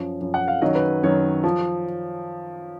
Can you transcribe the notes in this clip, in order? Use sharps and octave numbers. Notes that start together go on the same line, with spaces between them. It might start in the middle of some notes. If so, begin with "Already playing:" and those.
Already playing: F#2 F3
F#2 F3
F#5
F5
F#2 D#3 F#3 D#5
B4
F#2 D#3 F#3 C#5
F3